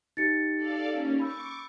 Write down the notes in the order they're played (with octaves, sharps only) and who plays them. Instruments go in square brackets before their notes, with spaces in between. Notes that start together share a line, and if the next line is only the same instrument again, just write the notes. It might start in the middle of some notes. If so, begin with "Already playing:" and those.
[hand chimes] D#4 G4 [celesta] A6 C#7
[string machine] A4 D5 F5
A#3 C#4
[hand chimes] B5 E6 G6 [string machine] C#6 D6